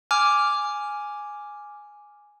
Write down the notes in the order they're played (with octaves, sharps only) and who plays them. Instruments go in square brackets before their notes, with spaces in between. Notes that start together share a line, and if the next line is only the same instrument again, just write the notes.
[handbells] G#5 D6 F6